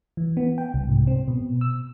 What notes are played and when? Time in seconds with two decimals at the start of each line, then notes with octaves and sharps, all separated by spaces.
0.17 E3
0.37 B3
0.58 G5
0.74 C2
0.89 G#2
1.07 C4
1.28 B2
1.61 E6